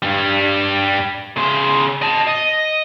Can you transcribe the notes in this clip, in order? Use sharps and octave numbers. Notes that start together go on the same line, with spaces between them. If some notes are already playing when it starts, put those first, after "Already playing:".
G2 G3
C#3 C5
D#5 A5
D#5